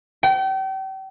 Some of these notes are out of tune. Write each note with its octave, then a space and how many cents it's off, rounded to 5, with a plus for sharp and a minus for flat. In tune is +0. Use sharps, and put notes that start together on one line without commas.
G5 -35